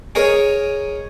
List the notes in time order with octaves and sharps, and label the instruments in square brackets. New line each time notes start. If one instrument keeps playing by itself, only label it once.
[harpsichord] G#4 A#4 C#5 D#5